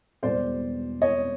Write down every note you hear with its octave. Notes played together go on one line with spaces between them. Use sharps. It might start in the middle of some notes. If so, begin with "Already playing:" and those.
E1 E2 B2 G3 C5 D5
C#5 D#5